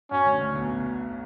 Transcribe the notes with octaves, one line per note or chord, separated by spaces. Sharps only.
F#2 F#3 C#4
D2 D3
D2 D3
B1 B2
B2